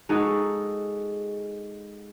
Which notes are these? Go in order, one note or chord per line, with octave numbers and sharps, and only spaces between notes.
G#3 D#4 F#4 G#4 A4